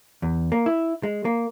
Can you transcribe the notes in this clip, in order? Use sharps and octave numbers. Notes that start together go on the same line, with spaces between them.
E2
A#3
E4
G#3
A#3